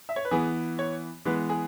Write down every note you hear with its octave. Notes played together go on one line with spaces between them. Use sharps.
E5
C#5
B4
E3 B3 G#4
C#5
E3 G#3 B3 B4
G#4